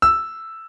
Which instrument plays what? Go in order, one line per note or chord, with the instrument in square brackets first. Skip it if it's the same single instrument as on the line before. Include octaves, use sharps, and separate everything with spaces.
[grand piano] E6